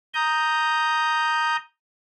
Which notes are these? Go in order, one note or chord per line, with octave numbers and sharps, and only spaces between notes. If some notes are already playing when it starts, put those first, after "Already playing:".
A#5 D#6 G6